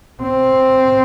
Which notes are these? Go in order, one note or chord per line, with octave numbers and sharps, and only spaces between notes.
C4